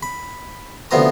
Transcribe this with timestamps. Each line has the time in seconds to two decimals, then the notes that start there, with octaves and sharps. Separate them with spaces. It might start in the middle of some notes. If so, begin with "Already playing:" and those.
0.03 B5
0.91 D2 C3 F3 B3 A#5 D#6